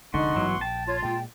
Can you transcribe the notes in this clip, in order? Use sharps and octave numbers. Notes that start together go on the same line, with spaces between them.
F1 D2 D3 G#3 D#4 F#5 C6 C#6
A1 G2 E3 F#3 B3
A#1 G5 A5
F4 C#5
A#2 G#3 G5